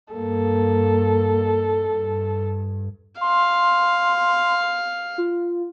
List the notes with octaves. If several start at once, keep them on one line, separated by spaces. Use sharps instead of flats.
G2 A#3 A4
G2
F5 C6
F4